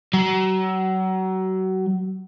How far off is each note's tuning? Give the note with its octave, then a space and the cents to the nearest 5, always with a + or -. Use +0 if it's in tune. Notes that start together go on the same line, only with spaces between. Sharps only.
F#3 +30